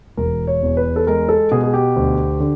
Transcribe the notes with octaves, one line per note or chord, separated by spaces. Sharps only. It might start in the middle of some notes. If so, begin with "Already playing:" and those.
E1 A#4
C#5
E2
B4
A4
G#3 A#4
A4
B2 G#4
G#4
G4
D2
D3